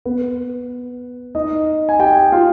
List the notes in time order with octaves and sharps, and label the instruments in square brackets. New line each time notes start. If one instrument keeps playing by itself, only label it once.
[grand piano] B3 B4
D#4 D#5
G#5
G4 G5
F4 F5